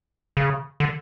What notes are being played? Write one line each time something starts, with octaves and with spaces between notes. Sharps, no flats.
C#3
D3